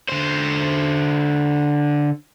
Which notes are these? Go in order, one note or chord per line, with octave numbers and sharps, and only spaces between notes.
D3 C5